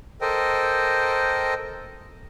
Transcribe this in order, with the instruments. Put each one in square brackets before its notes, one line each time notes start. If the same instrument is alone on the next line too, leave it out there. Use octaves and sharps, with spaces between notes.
[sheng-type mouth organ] A4 A#4 C5 D#5 G5